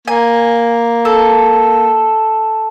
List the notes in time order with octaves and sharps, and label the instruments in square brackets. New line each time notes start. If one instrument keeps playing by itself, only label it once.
[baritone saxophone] A#3 [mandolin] G#5
[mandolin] A4